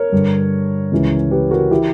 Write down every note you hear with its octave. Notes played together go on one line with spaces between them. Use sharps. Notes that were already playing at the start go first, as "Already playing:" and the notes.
Already playing: A#4 C#5
G2 D3
C#2 C#3 E3
G4 B4
F#4 A#4
E3 E4 G4